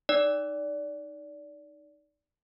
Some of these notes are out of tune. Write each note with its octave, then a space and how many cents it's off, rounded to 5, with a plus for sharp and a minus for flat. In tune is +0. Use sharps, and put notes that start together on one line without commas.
D#4 -10 D5 -20